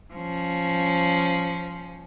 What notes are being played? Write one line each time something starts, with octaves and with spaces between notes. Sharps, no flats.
F3 C#4